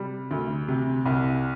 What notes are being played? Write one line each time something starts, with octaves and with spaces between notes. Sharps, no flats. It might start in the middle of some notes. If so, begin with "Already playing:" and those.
Already playing: C3 G3
D2
C3
C2